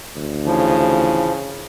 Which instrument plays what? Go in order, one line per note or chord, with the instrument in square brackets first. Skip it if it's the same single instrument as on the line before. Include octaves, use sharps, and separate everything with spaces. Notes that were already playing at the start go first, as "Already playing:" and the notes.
[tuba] D2
[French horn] C#3 [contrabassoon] E3 [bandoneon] F3